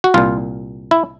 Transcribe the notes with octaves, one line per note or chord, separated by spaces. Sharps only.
F#4
C2 A#2 F4
E4